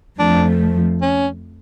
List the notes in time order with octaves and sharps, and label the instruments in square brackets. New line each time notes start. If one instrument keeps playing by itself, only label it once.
[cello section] F2 F3 A3 [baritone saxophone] D4
[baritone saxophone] C#4